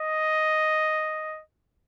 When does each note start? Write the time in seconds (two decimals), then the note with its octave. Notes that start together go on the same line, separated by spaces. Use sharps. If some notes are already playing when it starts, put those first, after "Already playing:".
Already playing: D#5